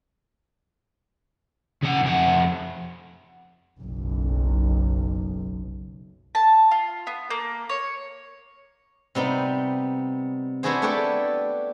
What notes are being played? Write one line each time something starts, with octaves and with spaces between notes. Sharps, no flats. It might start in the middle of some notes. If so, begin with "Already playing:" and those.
C#3 F#5
F2 F#5
F#1 B1
A5
F4
B3
A#3
C#5
C3 G3 B3 D#4
B3 D4 E4 F#4 G#4 C5
A3 D4 G4 A4 B4 D5